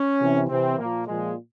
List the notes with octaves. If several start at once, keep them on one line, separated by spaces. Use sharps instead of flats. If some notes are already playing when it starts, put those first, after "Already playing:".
Already playing: C#4
C3 E3
C3 E3 C4
A#2 F3 A#3
A#2 F3 G#3